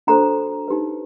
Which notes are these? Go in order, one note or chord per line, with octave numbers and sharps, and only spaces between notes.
D4 F#4 A4 C5 A#5
D#4 G4 B4